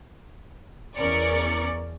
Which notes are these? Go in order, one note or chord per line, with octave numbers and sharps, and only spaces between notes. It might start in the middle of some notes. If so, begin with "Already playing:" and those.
E2 C#4 A#4 D5 C#7